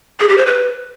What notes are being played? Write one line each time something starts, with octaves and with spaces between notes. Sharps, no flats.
G#4
G4
C5
B4